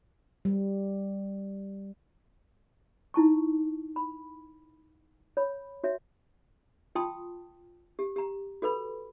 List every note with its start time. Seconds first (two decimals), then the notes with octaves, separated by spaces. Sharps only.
0.45 G3
3.14 D#4 E4 A5 C#6
3.96 B5
5.37 C#5 B5
5.84 F#4 C#5 E5
6.95 F4 G5 A5 C6 D#6
7.99 G4
8.16 G4 A#5
8.62 F#4 A4 B4 B5